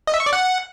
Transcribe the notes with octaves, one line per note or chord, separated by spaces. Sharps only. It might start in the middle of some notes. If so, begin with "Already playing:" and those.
D#5
E5
C#6
D5
F#5